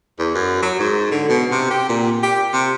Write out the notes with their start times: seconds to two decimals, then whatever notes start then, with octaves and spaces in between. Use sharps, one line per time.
0.19 E2
0.35 F#2
0.62 F#3
0.79 G#2
1.11 D3
1.29 B2
1.51 C3
1.70 G4
1.89 A#2
2.23 G4
2.53 C3